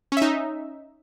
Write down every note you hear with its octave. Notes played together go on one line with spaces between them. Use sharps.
C#4 D#4 E5